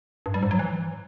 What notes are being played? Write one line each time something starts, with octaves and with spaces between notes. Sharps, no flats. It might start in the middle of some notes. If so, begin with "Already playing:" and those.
G2
G3
G#2
F#3
E3